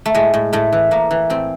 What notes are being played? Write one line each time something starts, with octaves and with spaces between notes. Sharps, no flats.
A3
A2 G#3
A2
A2 A3
E3
A2 A#3
E3
A2 C4